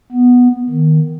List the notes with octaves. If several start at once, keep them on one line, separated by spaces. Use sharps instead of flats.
B3
D#3